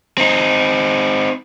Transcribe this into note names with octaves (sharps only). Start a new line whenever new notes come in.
C4 D#4